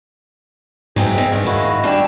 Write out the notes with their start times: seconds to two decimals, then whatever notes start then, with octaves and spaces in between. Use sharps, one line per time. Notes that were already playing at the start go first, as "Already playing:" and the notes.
0.96 G#2 F#3 B3 C4 G#4 E5 G5
1.18 C4 D#4
1.32 G2 C4
1.46 D#3 E4 F#4 D#5 F5
1.83 G#2 G3 D4 F4 G5 A5